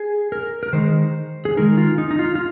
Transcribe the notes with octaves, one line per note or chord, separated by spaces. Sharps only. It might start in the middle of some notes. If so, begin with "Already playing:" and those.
Already playing: G#4
A#4
A#4
D#3 G#3 D#4 C5
G#4
D#3 G#3 D#4 A#4
F4
D#4
D#4
F4
F4